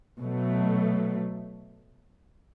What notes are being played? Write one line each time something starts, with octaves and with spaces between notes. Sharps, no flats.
B2 F#3 A3